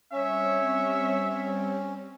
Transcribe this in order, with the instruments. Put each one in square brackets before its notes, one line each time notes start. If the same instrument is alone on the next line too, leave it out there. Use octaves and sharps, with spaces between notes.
[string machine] G3 C4 [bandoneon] C#4 [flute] C#5 [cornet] E5